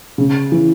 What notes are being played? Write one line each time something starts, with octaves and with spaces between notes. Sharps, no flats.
C#3
E3